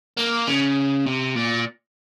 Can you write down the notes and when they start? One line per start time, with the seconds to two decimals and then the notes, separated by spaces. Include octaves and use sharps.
0.19 A#3
0.47 C#3
1.06 C3
1.35 A#2